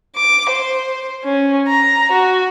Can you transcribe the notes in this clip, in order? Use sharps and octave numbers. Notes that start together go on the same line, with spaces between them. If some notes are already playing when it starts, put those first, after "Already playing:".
D6
C5
C#4
A#5
F#4